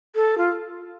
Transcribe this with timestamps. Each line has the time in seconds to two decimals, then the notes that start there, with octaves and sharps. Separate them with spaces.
0.15 A4
0.38 F4